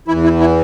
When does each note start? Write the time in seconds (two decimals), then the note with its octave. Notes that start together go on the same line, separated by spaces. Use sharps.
0.08 E2 E3 E4
0.24 E4
0.40 E4